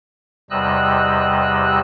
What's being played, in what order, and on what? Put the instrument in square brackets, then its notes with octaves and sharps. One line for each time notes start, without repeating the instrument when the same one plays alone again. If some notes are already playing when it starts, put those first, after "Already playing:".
[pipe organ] E2 C3 G3 D#5 E6 F#6